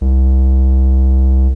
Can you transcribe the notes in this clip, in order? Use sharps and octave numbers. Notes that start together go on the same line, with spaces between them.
C2